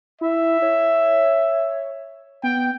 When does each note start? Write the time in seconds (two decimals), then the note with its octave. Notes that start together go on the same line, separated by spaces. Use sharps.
0.21 E4 E5
0.62 C#5
2.43 B3 G5